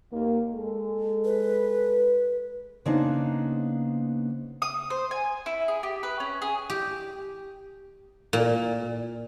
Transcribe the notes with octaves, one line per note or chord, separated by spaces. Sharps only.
D#2 A#3
G#3 A4
B4
C#3 A#3 B3 D4 D#4 C5
D#6
C5
G#5
E4
G#4
G4
B4
C#4
G#4
G4
A#2